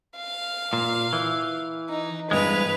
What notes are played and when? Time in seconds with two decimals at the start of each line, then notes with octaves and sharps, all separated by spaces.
0.17 F5
0.73 A#2
1.13 E3
1.90 D#4
2.31 E2 G2 G#3 B4 F7